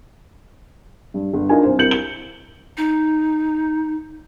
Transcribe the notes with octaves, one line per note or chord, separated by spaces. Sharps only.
G2
G1
D4 D#4 F4 A#4 G#5
C2 C5
C2 E4 A#4 G6 C#7 F#7
G7
D#4